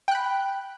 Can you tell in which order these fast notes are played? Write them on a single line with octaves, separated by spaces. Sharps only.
G5 F#6 B5